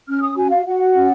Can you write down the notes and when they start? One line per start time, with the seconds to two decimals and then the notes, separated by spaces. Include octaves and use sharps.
0.08 C#4 F6
0.23 D#6
0.37 F#4 G#5
0.52 F5
0.66 F#4 F#5
0.95 C#4